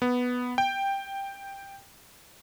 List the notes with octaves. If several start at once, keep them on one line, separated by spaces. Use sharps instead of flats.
B3
G5